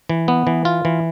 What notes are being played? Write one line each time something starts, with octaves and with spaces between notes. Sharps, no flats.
E3
B3
E3
F4
E3